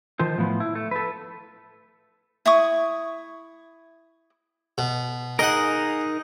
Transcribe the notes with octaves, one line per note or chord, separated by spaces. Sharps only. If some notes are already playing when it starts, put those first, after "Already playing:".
D#3 F3 C5
A2 F3 B3
E4
A3
A4 B4
E4 C#6 D#6
B2
D#4 G#4 A#4 D#5 F#5